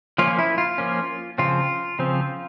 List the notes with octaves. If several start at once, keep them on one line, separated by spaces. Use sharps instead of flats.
F3 A#3 C#4 F4
E4
F4
F3 A#3 C#4
C#3 F3 C4 F4
C#3 F3 C4